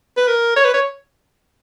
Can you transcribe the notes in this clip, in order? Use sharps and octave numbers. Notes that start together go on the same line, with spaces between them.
B4
A#4
C#5
B4
C#5